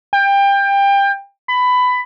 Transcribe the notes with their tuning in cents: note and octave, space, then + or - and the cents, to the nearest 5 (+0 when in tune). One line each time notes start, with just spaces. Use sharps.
G5 +25
B5 +15